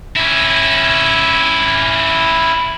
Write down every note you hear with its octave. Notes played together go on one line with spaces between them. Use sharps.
C#4 E4